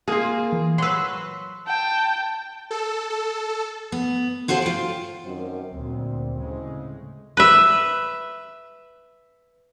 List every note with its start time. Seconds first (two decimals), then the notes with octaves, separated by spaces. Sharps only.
0.08 A#3 F4 G#4
0.52 E3
0.78 F#3 B4 C6 C#6 E6
1.67 G5 A5
2.71 A4
3.10 A4
3.92 B3
4.48 F4 F#4 A4 C5 F#5
4.62 F4 G5
5.25 F#2 D#3 C4
5.73 D2 A#2 C4
6.36 A2 C#3 G#3
7.37 B4 E5